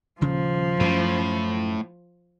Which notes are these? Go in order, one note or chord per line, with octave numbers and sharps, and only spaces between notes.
D#1 C#3 F3
F#2 A2 C#4